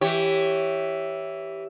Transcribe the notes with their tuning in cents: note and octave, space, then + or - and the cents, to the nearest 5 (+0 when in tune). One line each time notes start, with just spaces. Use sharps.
E3 +0 G4 +0 C#5 +0